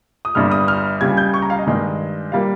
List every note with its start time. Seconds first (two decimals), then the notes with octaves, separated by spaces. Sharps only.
0.25 D#6
0.35 G1 G2 G3 F6
0.52 D#6
0.68 F6
1.01 C#2 C#3 G3 G#6
1.17 G6
1.34 C#6
1.42 A#5
1.50 F5
1.59 D#5
1.66 G2 D#3 G#3
2.32 G3 A#3 F5